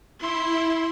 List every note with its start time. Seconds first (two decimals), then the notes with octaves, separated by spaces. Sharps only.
0.20 E4 C6